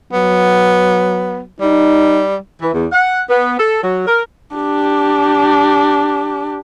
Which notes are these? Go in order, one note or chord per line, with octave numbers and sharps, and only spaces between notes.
F#3 B3
G3 D#4
E3
E2
F#5
B3
A4
F#3
A#4
D4 G4